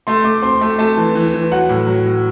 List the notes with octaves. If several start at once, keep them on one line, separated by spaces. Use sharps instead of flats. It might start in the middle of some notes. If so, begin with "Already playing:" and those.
A3 C6
A3 D6
C4 C6
A3
A3 A5
E3
E3
E3
F#3 F#5
A2
F#3
F#3